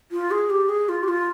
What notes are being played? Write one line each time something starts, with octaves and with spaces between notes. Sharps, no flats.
F4
G#4
G4
G#4
F4
G4
F4